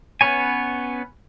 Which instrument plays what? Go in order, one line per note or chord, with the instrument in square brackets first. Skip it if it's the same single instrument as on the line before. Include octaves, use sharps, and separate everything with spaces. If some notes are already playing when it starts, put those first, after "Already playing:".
[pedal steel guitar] B3 C#4 B4 C#5 G#5